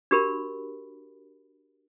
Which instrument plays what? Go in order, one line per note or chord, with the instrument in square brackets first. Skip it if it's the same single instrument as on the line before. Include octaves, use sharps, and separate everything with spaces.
[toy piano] D4 F#4 G4 A#4 B5